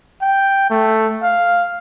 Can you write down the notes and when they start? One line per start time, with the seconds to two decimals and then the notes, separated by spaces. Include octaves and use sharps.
0.22 G5
0.70 A3
1.23 F5